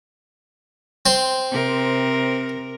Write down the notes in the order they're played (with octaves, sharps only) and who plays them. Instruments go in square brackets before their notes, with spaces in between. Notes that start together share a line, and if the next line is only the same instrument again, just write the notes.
[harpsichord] C4 C6
[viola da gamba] C3 A#4